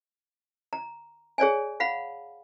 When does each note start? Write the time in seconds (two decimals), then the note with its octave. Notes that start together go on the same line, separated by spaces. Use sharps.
0.73 A#5
1.38 G#4 C#5 D5 G#5
1.80 F5 F#5 B5